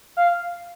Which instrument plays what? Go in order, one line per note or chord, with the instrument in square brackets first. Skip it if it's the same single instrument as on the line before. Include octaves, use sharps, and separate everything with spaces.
[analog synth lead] F5